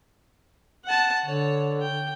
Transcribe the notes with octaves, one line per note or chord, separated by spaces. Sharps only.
F#5 A5
D3 C#5
G5